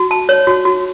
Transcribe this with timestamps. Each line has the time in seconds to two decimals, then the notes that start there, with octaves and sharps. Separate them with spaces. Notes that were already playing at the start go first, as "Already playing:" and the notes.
Already playing: F#4
0.11 A5
0.29 C#5
0.47 F#4
0.65 F#4